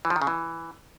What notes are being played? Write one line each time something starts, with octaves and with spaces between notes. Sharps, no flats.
E3
F3
D#3
C#3
E3